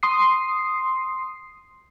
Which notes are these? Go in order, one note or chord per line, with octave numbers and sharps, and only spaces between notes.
C6 D#6 C7